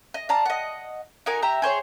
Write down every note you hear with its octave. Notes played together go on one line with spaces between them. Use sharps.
D#5
D5 F5 A5 A#5
D#5 F#5
D#4 F#4 A#4 G#5
G4 E5 A#5
G#4 C5 C#5